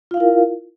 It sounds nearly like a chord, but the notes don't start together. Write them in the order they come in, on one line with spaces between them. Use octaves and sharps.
F4 F5 E4 A#4